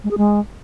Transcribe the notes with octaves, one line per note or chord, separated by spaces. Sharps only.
G#3
G#4
G#3